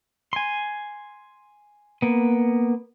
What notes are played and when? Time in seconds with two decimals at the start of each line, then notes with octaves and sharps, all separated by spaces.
0.33 G#5 C6
2.02 A#3 B3